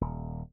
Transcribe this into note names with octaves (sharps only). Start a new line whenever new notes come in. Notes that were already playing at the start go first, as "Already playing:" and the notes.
D#1